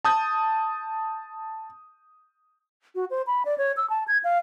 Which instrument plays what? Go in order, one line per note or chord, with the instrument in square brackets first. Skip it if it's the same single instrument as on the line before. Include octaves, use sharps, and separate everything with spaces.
[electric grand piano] A5 D#6 G6
[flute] F#4
C5
B5
D5
C#5
E6
A5
G#6
F5